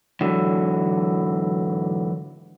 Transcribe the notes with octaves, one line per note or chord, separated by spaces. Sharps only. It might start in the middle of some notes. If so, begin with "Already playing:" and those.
G#2 D3 E3 F#3